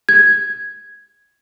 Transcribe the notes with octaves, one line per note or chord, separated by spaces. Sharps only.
G#6